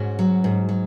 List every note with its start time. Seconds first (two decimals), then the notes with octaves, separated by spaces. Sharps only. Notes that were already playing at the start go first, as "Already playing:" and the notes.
Already playing: G#2 C#4 F#4
0.19 F#3
0.44 G#2
0.69 F#3